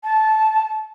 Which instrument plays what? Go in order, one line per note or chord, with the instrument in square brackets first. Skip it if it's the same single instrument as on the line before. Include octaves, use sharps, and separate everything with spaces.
[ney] A5